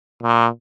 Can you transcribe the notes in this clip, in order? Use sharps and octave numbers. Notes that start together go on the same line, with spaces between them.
A#2